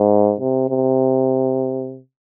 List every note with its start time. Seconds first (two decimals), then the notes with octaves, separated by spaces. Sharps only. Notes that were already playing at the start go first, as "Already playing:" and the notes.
Already playing: G#2
0.40 C3
0.69 C3